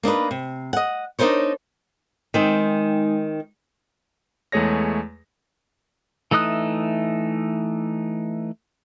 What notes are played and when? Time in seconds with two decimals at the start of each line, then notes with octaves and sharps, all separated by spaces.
0.03 A#3 D4 D#4 B4
0.31 C3
0.73 D#5 F#5
1.19 D4 D#4 F4 A#4 C5 C#5
2.34 D#3 G#3 C4 D#4
4.52 E2 G#3 A3 G#4 C#5 A#6
6.31 E3 A3 D#4 D#6 F#6